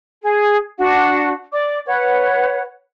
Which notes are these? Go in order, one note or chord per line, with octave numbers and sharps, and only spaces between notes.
G#4
D4 F#4 F#5
D5 D6
B4 C#5 F#5